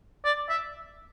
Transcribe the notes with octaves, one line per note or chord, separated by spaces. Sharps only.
D5
E5